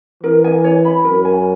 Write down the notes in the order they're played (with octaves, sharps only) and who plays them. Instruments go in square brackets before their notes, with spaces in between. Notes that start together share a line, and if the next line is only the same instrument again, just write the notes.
[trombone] E3 [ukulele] A#4
[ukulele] G#5
C#5
B5
[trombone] F#2 [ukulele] A#4
[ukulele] G#5